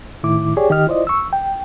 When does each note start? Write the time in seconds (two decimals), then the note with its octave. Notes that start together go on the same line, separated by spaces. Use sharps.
0.23 A2 D#3 E4 D6
0.57 G4 G#4 C#5 D5
0.70 D#3 G4 D#5 F6
0.87 E4 F4 C5 D5 D#5
1.07 C#6 E6
1.33 G5